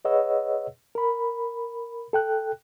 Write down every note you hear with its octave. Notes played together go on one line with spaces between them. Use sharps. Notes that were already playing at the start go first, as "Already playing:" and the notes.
G#4 B4 C#5 D#5 F#5 E6
A#4 B5
A4 G5 F#6